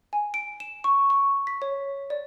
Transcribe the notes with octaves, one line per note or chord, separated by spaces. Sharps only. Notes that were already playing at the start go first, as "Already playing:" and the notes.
G#5
D7
E7
C#6
C#6
B6
C#5
D5